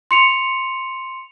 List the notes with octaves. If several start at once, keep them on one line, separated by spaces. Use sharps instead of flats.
C6 C#7 F7